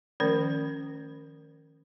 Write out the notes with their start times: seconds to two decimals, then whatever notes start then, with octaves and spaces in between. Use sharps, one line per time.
0.20 D#3 F3 A3 C#4 A#4